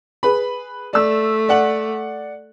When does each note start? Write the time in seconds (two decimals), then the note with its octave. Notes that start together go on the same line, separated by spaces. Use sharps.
0.23 G#4 B4 B5
0.93 A3 D5 E6
1.49 D5 F#5 F#7